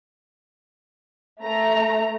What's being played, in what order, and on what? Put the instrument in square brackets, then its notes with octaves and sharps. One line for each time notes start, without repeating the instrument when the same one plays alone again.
[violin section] A3 A#5